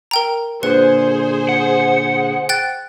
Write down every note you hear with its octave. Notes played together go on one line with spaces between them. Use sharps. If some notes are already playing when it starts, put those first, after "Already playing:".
A#4 G5 A#5
A#2 D3 G#4 B4 C5 C#7
F#5
G5 F#6 A6